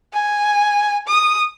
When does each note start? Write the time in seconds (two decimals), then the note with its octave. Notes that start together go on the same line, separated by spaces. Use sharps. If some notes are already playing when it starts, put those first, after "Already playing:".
0.14 G#5
1.08 D#6